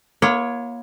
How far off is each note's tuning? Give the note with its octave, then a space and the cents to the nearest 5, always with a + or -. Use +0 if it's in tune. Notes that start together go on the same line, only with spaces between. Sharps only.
A#3 +35 F4 -45 C#5 +0